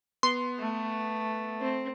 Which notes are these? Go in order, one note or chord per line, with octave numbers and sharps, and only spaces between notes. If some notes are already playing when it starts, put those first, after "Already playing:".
B3 C6
A3
C4